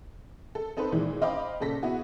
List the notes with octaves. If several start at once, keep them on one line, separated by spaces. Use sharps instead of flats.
A4
C4 D#4 A4 B4 C5
A#2 D#3 E3 G#3
C5 D#5 F5 G5 B5 D6
A#2 C#3 A4 A#6 B6
B3 E4 F#4 G#4